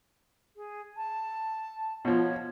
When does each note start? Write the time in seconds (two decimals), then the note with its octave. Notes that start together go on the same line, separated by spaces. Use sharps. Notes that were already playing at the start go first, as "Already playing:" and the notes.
0.56 G#4
0.97 A5
2.05 B2 F3 C#5